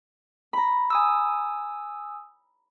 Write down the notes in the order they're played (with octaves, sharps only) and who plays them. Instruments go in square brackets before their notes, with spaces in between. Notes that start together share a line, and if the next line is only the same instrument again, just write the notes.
[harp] A#5 B5
[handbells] G#5 D#6 E6